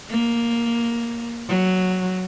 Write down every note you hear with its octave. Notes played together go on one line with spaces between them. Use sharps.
A#3
F#3